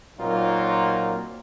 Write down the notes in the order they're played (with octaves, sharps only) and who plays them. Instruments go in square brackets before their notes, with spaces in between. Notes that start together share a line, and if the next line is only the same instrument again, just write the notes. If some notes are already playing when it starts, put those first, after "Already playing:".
[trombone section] A#2 F#3 A#3 C4 D#4 F4